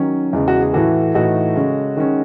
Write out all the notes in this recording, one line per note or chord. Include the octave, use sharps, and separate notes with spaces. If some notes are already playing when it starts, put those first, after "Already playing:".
Already playing: D#3 F#3 C#4
E2 C#3 G#3
F#4
G#4
A2 E3 A3 F#4 A4
A2 E3 A3 D#4 F#4 A4
C#3 G#3 C#4
D#3 G#3 C#4